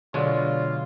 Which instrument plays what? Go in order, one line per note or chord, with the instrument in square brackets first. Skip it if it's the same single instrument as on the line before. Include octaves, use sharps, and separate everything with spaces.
[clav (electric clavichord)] B2 F#3 G#3 [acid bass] D3 [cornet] F4 [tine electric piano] C#5 D5